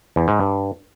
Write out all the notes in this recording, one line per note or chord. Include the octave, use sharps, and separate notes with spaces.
E2
G#2
G2